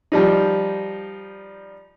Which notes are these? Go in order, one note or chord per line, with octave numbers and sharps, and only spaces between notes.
F3 G3 D#4